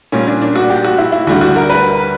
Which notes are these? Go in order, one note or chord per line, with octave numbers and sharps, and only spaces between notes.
A#2 G3 C#4
D4
D4
F#4
G4
F#4
E4
E4
D2 D3 G3 F#4
F#4
A#4
B4